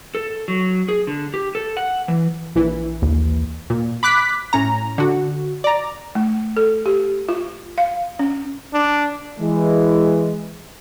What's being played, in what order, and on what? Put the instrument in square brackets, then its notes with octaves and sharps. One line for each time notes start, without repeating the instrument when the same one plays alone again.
[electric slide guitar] A4
F#3
G#4
D3
G4
A4
F#5
E3
[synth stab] A#1 E3
[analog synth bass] D#2
[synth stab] A#2
B5 D6 F#6 B6
A2 C#4 A#5
D3 F#4
D5 A#5
[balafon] A3
A4
G4
F4
F5
C#4
[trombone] D4
[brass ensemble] E3 G#3